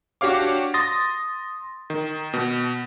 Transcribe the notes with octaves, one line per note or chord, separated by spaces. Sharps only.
D4 F#4 G4 C#5 F5 D6
C6 D#6 A6 A#6
D#3
B2